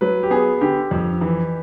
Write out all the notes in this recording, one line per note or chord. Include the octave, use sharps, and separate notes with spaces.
F#3 B4
G4
B3 G#4
D3 G4
F2
E3